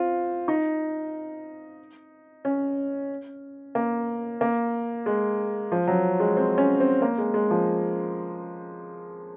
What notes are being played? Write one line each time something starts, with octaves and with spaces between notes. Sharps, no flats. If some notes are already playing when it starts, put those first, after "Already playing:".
Already playing: C4 F4
D#4
C#4
A#3
A#3
G#3
F3
F#3
G#3
C4
C#4
C4
A#3
G#3
G#3
F3